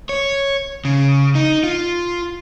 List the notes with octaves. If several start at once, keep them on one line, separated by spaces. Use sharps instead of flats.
C#5
C#3
D#4
F4